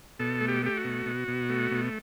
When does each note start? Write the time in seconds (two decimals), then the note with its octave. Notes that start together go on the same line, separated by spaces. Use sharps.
0.19 B2 A4
0.41 A3
0.48 G4
0.63 A3 G4
0.77 F#4
0.84 B2
1.06 B2
1.28 B2
1.50 A3
1.71 B2